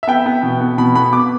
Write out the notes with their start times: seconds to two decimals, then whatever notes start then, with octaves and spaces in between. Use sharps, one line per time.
0.03 E5
0.07 B3 G5
0.26 B3
0.43 B2
0.61 B3
0.78 B2 B5
0.95 B3 B5
1.12 B3 D6